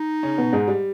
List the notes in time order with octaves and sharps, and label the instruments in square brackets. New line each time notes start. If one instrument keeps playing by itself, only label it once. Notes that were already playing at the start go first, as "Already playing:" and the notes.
Already playing: [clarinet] D#4
[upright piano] C#3 C#4
B2 B3
G#2 G#3
G3